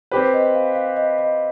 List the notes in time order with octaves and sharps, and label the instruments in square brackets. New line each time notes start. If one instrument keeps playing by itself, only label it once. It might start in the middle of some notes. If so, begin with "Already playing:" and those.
[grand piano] C4 G4 B4 [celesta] C5
[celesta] D#5
F5
F5
D#5
D#5